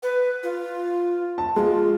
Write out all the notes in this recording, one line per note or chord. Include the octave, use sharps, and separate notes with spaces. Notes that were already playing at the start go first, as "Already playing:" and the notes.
B4
F4
A5
G#3 F4